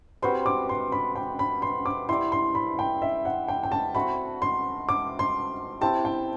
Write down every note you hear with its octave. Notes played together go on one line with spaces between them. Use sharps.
G3 C4 F#4 B4 C6
D6
C6
B5
G5
B5
C6
D6
E4 G4 D5 C6
C6
B5
G5
E5
F#5
G5
G5
A5
A3 C4 F#4 B5
C6
D6
C6
C4 E4 G4 A5
G5